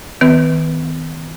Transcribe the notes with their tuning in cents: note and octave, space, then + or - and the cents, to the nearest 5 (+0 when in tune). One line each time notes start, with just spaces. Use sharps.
D#3 +45 B3 +35 B4 +0